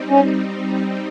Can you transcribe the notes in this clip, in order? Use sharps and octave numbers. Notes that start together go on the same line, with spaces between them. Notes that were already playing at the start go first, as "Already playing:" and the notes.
Already playing: G3 C4 D#4
C#4